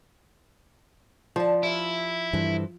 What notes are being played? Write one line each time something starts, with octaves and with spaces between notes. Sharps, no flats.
D3 F3 A5
E4 G4 E5 F5
G2 E3 F#4 A4 C5